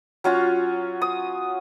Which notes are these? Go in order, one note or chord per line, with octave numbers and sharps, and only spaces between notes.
F#3 C#4 F4 F#4
D#6